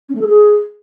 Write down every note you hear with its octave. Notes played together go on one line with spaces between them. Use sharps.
C#4
A3
A4
G#4